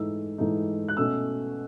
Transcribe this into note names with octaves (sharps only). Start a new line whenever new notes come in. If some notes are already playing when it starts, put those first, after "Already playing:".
Already playing: G#2 E3 A3 D#4 E6
G#2 E3 A3 D#4
F#6
B2 A3 C#4 E6